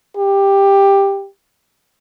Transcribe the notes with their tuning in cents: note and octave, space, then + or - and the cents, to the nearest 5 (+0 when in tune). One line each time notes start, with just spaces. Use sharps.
G4 +10